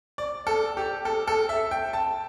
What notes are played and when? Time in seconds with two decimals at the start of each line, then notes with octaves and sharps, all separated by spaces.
0.18 D5
0.47 A4
0.77 G4
1.05 A4
1.27 A4
1.49 E5
1.71 G5
1.93 A5